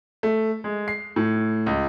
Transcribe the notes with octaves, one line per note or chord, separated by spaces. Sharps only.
A3
G#3
C7
A2
C#2